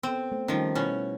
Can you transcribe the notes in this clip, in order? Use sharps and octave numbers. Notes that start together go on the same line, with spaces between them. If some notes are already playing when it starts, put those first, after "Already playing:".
B3 C4 A4
A3 C5
D#3 F3 G3 C#4
B2 C#4 E4